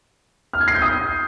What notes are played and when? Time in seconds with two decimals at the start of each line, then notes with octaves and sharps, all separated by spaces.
0.53 F6
0.61 G#6
0.68 C7
0.75 G6
0.82 D#6